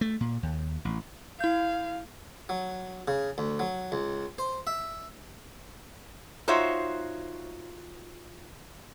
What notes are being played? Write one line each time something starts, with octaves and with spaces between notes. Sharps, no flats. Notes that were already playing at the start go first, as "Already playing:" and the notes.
A3
A#2
D#2
A1
E4 F5 G6
F#3
C#3
D2
F#3
C#2
C5
E5
D#4 F4 F#4 C5 C#5 E5